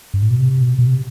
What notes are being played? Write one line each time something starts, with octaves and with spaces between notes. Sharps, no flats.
G2
A2
B2
C3
B2
B2
C3